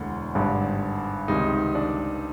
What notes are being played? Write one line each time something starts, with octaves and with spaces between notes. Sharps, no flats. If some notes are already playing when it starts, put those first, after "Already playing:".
Already playing: E1 D2 D3
G#1 G2 D3
C#2 C3 D#3 D#4
D4